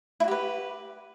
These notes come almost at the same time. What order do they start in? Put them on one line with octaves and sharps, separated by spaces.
E4 F#4 G4 B4